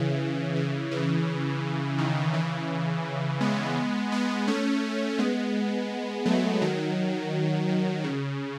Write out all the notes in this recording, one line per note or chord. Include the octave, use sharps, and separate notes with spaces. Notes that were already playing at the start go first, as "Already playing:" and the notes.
Already playing: C#3 E3
C#3 E3
C#3 E3
D#3
C#3 E3
G#3 B3
G#3 B3
A3 C#4
G#3 B3
F#3 A3
D#3 F#3
D#3
C#3